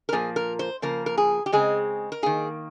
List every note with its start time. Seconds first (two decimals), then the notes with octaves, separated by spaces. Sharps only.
0.09 A#4
0.13 A#2 F3 A#3 G#4
0.36 A#4
0.59 C5
0.82 C#3 F3 A#3 A#4
1.06 A#4
1.18 G#4
1.46 G4
1.52 C#3 G#3 C4 G#4
2.12 A#4
2.23 D#3 A#3 G#4